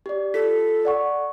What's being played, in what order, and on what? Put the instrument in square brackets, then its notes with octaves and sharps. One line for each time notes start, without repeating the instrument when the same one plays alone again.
[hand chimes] G4 D5
[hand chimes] F4 B6 [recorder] A4
[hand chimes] D5 F#5 C#6